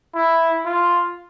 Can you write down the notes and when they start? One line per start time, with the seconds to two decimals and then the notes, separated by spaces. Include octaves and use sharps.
0.15 E4
0.65 F4